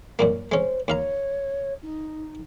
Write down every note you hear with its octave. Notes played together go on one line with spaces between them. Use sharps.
F#2 A#2 A#3
G#3 C#4 C5
D#2 C#5 F5 A#5
D#4